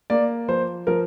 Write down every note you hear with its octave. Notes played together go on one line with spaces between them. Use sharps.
A#3 D5
F3 C5
F3 A#4